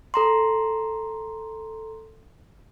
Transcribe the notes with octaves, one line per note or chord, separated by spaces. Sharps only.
A4 A#5 C6